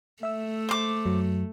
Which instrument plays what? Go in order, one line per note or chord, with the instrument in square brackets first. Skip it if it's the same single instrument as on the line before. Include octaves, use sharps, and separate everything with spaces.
[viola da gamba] A3 [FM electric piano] E5 E6
[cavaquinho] C5 D6
[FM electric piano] F#2 F#3